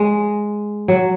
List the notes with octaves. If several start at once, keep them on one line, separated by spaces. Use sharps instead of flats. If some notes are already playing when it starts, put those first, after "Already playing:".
Already playing: G#3
F#3